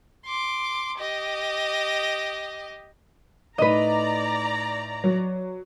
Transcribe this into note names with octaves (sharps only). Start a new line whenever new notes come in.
C6 D6
G4 D#5
A2 D#4 B4 D5 D#5 A#5 D#7
F#3